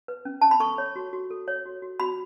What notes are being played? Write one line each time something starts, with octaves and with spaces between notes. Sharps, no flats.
B4
C#4
C#4 A5
B5
A4 C#6
C#5
F#4
F#4
A4
C#5
F#4
F#4
F#4 B5